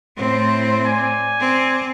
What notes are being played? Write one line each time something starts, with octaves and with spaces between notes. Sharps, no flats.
A2 C4 E4 C5
D5 G#5
C4